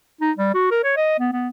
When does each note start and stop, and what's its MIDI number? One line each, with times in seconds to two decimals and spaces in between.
0.21 0.32 63
0.37 0.51 55
0.54 0.71 66
0.71 0.79 70
0.84 0.93 73
0.97 1.18 75
1.19 1.29 59
1.32 1.48 59